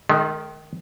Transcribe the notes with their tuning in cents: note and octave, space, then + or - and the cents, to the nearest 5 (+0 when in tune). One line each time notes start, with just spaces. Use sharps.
D#3 -10 G#3 +40